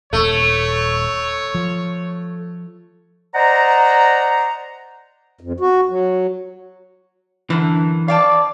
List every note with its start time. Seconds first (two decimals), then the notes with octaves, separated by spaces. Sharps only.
0.13 D#1 A3 C#5
1.55 F3
3.34 C5 D5 D#5 F#5 A#5
5.41 F2
5.60 F#4
5.89 F#3
7.50 F#2 D3 E3
8.08 D5 F5 G5 A5